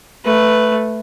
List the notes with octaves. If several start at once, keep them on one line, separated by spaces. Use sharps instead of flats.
A3 B4